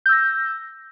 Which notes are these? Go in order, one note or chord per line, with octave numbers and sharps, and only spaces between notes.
E6 G6 A#6